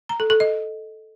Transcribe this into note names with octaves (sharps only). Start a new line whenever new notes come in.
A#5
A4
A4
D#5